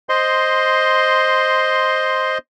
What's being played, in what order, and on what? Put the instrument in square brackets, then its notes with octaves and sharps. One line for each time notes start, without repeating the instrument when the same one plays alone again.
[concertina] C5 D#5 C6